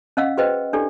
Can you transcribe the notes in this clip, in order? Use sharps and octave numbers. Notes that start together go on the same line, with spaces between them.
C#4 D#5 F5 F#5 E6
F#4 G#4 B4 C5 D#5 G5
D4 E4 G4 A4 D5